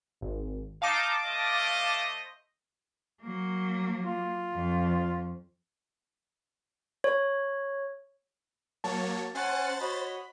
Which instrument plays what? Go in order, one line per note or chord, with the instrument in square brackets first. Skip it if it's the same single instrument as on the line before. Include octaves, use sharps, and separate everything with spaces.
[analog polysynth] G#1
[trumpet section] D#4 [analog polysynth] F5 A5 D6
[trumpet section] A3 C5 D#5
[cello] F#3 A#3
[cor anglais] F4
[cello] F2
[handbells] C#5
[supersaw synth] F#3 A#3 C#5 [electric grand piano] A5
[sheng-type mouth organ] C#4 G#5 [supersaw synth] C5 A6 [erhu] F#5
[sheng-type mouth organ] F#4 C#5 D#5 [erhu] B5